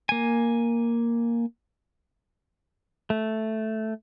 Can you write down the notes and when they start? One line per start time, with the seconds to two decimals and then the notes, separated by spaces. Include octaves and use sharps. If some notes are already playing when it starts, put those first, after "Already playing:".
0.09 A#3 G#5
3.10 A3